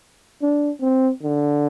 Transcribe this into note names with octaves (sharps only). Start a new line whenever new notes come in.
D4
C4
D3